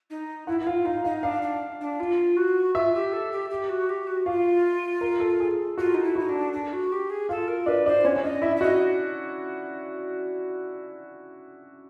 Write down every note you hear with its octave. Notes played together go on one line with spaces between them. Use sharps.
D#4
E4 F#5
E4
F4 F5
D#4 F5
D#4 F5
D4 F5
D4
D4
F4
F#4
F4 E5
G4
A4
G4
G4
F#4
G4
F#4
F4 F5
A#4
A4
G#4
F4 F#4
D#4
E4
D#4 F#4
D4
D4
F#4
G4
G#4
F4 A4
A#4
D4 B4
D4 C5
C#4 C#5
C#4
D4 D#5
E4 E5
E5
F#4 D#5